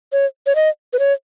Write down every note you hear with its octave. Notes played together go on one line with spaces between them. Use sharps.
C#5
C#5
D#5
B4
C#5